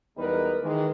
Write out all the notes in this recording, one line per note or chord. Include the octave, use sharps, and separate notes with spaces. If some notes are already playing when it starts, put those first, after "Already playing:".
E2 G3 G#3 D#4 A#4 B4
D#3 E3 G#3